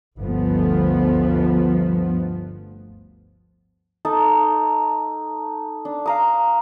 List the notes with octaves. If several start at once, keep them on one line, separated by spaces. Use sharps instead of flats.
G1 D2 F3 B3
D#4 A4 A5 D6
D4
F5 A#5 D#6